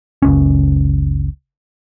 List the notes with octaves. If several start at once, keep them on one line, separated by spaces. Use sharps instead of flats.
F#1 C#2 C#4